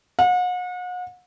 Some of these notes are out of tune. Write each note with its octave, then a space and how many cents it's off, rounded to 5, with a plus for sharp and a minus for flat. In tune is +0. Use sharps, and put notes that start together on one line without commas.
F#5 -40